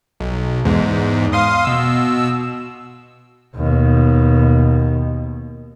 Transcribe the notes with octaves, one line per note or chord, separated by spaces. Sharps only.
B1
E2 G#2
F5 C6 D#6
B2 E6
D#2 B2